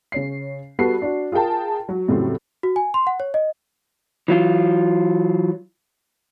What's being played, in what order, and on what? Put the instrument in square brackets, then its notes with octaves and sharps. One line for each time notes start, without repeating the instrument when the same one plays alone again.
[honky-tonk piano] C#3 C#5 C7
G3 B3 F#4 A4 C7
D4 F#4
F4 G#4 A#4 G5 A5
F#3
F2 A2 C#3 F#3 G3 C4
[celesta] F#4
G#5
C6
F#5
C#5
D#5
[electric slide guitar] E3 F#3 F4